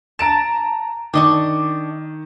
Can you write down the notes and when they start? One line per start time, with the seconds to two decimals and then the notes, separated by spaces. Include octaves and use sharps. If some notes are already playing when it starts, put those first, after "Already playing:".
0.19 A5 A#5 D7 E7
1.14 D#3 D4 D#5 C#6